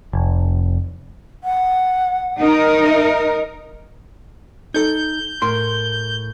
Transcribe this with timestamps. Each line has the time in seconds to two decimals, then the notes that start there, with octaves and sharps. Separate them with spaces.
0.13 F1
1.44 F#5
2.38 D#4 A#4
2.83 E5
4.74 D#4 A4 G6
5.42 A2 A#4 C6